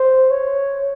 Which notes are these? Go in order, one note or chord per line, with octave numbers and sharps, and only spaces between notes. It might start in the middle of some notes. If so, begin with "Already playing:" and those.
Already playing: C5
C#5